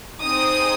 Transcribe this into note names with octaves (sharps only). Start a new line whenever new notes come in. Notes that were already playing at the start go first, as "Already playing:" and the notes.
C4 D#4 G#4 D#6